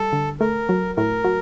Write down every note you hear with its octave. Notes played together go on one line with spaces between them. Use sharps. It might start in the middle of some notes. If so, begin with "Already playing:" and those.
Already playing: G3 A4
D3
A3 A#4
F#3
A2 A#4
F#3